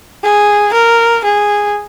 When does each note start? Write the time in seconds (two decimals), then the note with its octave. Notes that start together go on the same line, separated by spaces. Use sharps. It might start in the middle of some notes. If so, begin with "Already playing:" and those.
0.24 G#4
0.74 A#4
1.24 G#4